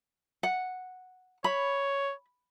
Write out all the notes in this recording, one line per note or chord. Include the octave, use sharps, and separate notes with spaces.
F#5
C#5 B5